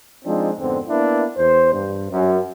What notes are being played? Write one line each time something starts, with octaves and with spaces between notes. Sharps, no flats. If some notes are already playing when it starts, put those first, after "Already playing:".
F3 G#3 C4 D4 D#4
F2 G#2 D3 B3 C4
A#3 B3 D4 E4
E2 C5
G2
F#2